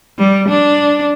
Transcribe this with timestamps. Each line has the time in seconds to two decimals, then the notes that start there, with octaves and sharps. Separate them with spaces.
0.19 G3
0.49 D4